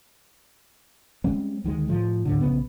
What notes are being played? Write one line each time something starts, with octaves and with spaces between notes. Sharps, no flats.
G3 G#3 C4 C#4
D2 D#3 E3 G#3
A2 F3
D2 A2 D3
A#1 C#3 B3